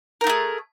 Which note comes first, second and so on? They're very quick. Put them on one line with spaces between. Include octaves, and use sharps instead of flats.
A#4 D#4 A3 G#4